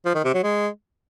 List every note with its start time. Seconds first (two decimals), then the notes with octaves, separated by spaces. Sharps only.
0.05 F3
0.15 D#3
0.24 C3
0.34 F#3
0.44 G#3